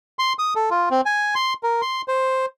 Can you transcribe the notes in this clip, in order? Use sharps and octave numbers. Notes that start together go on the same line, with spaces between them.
C6
D#6
A4
F4
C4
G#5
C6
A#4
C6
C5